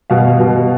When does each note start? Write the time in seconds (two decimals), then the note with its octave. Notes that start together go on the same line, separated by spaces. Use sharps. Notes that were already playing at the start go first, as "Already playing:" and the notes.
0.10 B2 F5
0.40 B2